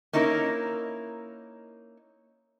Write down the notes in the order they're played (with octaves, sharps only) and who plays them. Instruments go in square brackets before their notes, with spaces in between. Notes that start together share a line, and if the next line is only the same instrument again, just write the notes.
[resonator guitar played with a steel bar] A#3 C#4 D#4 E4 A4 A#4